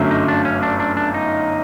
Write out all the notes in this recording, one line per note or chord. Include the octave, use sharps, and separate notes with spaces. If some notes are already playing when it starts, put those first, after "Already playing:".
Already playing: G1 F#2 D3 F#3 A3
D#4
D4
C#4
D4
D4
D4
D#4